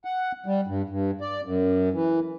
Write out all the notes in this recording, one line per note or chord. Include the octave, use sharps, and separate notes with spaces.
F#5
G3
G2
G2
D5
F#2
E3